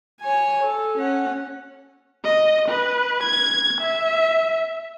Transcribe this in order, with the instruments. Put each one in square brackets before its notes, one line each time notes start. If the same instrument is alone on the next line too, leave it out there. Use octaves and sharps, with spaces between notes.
[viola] C#5 G#5
A4
C#4 F#5
[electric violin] D#5
B4
G#6
E5